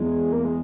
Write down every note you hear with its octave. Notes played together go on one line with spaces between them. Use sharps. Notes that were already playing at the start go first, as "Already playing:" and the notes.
Already playing: E2 G#3
A#3
G#3